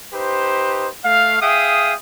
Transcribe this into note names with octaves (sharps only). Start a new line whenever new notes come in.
D#4 G4 B4 C5
A3 F5
G#4 E5 F5 G5 D#6